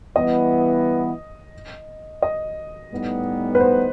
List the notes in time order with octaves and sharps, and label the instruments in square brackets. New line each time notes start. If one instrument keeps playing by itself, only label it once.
[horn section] E3 G3 B3 E4 [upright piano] D#5
[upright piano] D#5
[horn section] A2 G3 B3 D#4
[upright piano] B4
C5